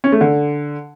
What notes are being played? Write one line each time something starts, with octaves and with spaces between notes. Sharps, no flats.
C#4
A3
D3